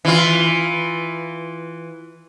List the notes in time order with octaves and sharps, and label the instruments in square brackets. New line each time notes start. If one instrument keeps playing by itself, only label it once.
[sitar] E3 F4